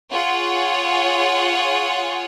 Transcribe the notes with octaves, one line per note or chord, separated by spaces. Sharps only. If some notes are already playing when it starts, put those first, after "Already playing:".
F4 G#4 C#5 F#5